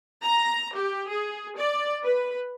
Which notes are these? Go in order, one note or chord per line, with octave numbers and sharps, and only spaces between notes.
A#5
G4
G#4
D5
B4